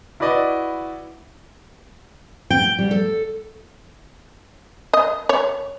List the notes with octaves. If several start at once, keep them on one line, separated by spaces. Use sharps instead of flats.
E4 F#4 B4 D5 D#5
G5
G3
A4
D#5
C#5